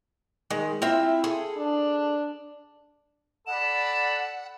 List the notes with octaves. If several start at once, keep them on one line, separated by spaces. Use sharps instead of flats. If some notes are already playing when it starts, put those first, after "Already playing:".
D#3 G#3
C4 E4 F4 E5
G#4 A4
D4
A4 D5 F#5 B5 E7